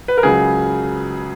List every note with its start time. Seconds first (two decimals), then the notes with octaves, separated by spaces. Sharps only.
0.08 B4
0.17 A#4
0.23 C#2 C#3 F#3 G#4